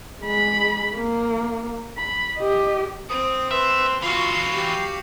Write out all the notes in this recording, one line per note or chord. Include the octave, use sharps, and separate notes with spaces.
G#3 B5
A#3
B5
G4 D#5
C4 D#6
B4 E5 C6
E3 F#3 F4 F#4 F5 C7
G4